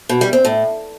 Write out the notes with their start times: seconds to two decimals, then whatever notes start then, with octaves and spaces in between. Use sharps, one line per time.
0.09 B2
0.21 G3
0.33 C4
0.45 A2